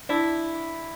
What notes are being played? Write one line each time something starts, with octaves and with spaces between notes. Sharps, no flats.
D4 E4